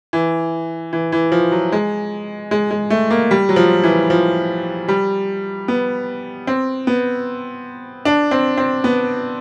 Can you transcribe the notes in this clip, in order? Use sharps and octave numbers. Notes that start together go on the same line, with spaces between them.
E3
E3
E3
F3
F#3
G#3
G#3
G#3
A3
A#3
G3
F#3
F3
E3
F3
G3
B3
C4
B3
D4
C4
C4
B3